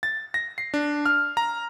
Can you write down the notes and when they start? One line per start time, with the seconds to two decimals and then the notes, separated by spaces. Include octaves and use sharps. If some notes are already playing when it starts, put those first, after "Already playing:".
0.03 A6
0.34 A#6
0.58 C7
0.74 D4
1.06 F6
1.37 A#5